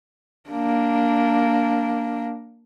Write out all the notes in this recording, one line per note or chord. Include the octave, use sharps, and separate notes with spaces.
A#3 D4